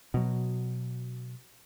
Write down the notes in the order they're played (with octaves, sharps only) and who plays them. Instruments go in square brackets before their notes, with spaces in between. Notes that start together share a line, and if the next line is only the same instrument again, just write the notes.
[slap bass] B2 F#3